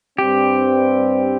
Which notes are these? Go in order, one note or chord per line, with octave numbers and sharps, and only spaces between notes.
G2 G3 C4 G4